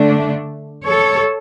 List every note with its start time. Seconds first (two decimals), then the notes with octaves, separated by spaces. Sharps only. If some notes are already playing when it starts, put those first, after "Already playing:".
Already playing: D3 A3 D4
0.85 A4 C#5